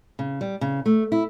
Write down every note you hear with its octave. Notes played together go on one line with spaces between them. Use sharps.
C#3
G3
C#3
A3
E4